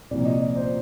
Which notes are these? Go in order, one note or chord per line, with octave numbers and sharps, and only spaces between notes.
C2 A#2 F3 D5
D#5
D5
C5